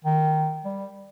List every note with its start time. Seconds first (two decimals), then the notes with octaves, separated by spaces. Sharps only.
0.05 D#3
0.65 G3